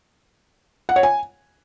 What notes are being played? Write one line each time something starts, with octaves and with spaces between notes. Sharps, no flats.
F#5
C#5
G#5